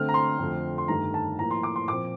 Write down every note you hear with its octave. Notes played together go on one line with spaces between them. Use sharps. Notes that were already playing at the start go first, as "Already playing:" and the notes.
Already playing: D3 A3 C4 F6
A#5
C6
F2 D3 A3 C4
C6
G2 D#3 A3 A#5
A5
A2 F3 A#3 A#5
C6
D6
C6
A#2 F3 C4 D6